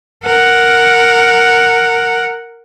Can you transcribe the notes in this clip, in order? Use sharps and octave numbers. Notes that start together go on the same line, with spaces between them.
A#4 F#5